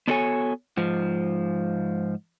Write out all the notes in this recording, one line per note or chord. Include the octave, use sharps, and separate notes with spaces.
B3 D4 F#4 A4 C#5 G#5
G#2 F3